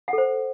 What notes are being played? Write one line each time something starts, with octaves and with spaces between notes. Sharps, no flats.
F#5
A4
C5